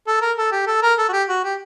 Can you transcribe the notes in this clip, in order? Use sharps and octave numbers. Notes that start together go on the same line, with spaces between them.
A4
A#4
A4
G4
A4
A#4
A4
F#4
G4
F#4
G4